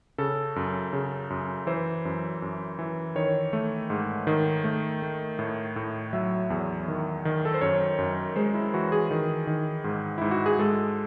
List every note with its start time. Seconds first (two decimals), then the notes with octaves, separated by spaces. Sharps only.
0.18 C#3 A4
0.56 F#2
0.93 C#3
1.30 F#2
1.67 E3 C5
2.05 F#2
2.42 F#2
2.79 E3
3.15 D#3 C#5
3.53 A3
3.90 G#2
4.27 D#3
4.64 A3
5.02 A3
5.39 A2
5.76 A2
6.13 F#3 E5
6.50 E2
6.88 D#3
7.25 D#3
7.45 A4
7.54 C5
7.61 F#2 C#5
7.98 F#2
8.36 G#3 C5
8.54 E4
8.74 E3 F#4
8.92 G#4
9.11 D#3
9.47 D#3
9.84 G#2
10.18 G#2 E4
10.31 F#4
10.46 G#4
10.58 G#3 A4